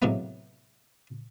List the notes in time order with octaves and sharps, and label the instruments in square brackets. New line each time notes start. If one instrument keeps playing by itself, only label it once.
[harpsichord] A2 C3 F#3 G#3 A#3 B3